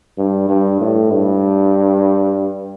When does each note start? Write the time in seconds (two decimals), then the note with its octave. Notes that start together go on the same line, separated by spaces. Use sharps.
0.18 G2
0.49 G2
0.80 A2
1.11 G2